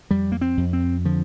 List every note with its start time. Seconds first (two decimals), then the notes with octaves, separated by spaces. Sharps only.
0.10 F2 G3
0.32 A#3
0.41 C4
0.57 F2
0.73 C4
1.05 D3 F3